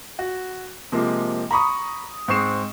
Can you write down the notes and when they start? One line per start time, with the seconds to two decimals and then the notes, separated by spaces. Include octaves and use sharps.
0.19 F#4
0.92 C3 F3 G#3 A#3
1.51 A#5 B5 C#6 D#6
2.28 G#2 C4 C#6 C7 E7